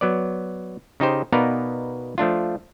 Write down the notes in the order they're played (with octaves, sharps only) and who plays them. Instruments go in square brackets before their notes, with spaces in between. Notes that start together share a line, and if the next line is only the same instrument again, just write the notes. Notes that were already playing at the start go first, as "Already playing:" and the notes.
[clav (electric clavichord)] F#3 B3 D5
C#3 D#4 G4 C5
B2 B3 D#4 A#4 D5 F5
F3 A3 D4 F4